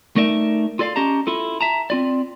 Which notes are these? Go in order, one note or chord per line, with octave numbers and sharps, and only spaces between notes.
A3 D#4 A#4 D5 E5
F4 A4 D5 D#5 F5
C#4 G4 D#5 A5 A#5
E4 F4 A4
E5 A5 A#5
C4 F4 D5